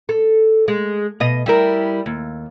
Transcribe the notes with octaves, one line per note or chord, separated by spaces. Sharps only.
A4
G#3
B2 D#5
G3 E4 A#4
D#2